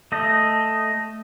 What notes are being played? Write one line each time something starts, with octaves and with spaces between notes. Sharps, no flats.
A3 D#5